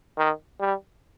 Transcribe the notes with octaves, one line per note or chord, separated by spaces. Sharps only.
D#3
G3